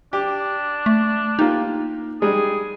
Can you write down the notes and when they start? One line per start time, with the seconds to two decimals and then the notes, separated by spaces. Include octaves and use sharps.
0.13 D4 G4
0.86 A3
1.39 A#3 D#4 F4 G4
2.22 G3 G#3 G#4